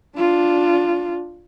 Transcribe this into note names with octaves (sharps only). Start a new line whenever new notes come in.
D4 F4